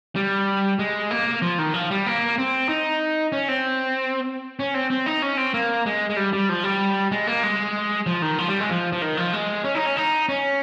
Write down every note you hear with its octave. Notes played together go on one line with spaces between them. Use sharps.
G3
G#3
A#3
F3
D#3
F3
G3
A#3
C4
D#4
C#4
C4
C#4
C4
C4
D#4
C#4
C4
A#3
G#3
G#3
G3
G3
F3
G3
G#3
A#3
G#3
F3
D#3
F3
G3
G#3
F3
F3
D#3
F3
G#3
C#4
D#4
C#4
D#4
C#4